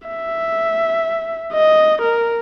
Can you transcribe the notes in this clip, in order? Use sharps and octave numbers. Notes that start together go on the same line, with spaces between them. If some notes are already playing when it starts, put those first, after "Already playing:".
E5
D#5
A#4